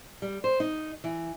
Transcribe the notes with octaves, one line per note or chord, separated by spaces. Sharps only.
G3
C5
D#4
E3